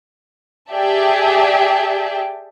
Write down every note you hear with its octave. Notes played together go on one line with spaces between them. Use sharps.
G4 G#4 D5 E5 G5 A5